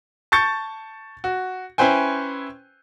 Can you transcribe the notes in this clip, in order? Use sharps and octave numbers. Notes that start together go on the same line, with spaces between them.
A5 C#6 G6 A6 C#7
F#4
C#4 E4 B4 C5 G5 G#5